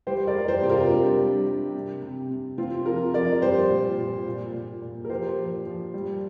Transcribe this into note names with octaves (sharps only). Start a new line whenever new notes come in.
G3 G4 C5
A#4 D5
G3
G4 C5
C3 G4
F4 A#4
G3 D4 G4
G3
G3
C3
C3
C3
C3 C4 F4
F3 F4 A#4
F3 A#4 D5
G3 G4 C5
A#2
A#2
A#2
A#2
A#2
A#4
F3 G4 C5
F3
F3
G3